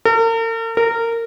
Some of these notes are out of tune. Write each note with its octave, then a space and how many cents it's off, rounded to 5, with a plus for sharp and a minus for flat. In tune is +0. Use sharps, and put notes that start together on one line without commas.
A#4 -45
A#4 -20